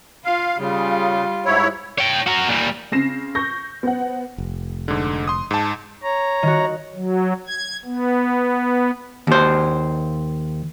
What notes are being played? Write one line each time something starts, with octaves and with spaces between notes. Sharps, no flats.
F4 F5
C#3 G3 F4
G#2 E4 C#5
C#5 G5
F#4 A#4
A#2 G3
C#3 C4 A#6 C7 E7
C#6 G6 A#6
B3 C5 F#5
F1
G#2 D3
C6 D#6
G#2 A5
C#5 A#5
D#3 F#4
F#3
G#6
B3
D#2 C5